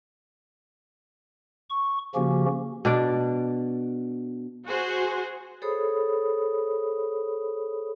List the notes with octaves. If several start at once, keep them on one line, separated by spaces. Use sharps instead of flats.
C#6
C#3 F3 A#3 C#4 F#4 G4
B2 D4 D5
F#4 G#4 C5
G#4 A4 C5 C#5 B5 D#6